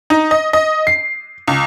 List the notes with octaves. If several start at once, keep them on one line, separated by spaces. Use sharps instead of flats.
D#4
D#5
D#5
C7
C#2